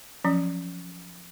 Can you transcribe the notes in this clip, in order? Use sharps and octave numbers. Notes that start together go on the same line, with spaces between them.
F3 F#3 C#4